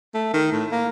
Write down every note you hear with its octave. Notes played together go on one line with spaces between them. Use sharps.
A3
D#3
A2
A#3